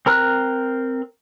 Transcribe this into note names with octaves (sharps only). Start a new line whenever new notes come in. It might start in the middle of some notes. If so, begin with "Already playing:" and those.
C4 A#4 A#5 F6 F#6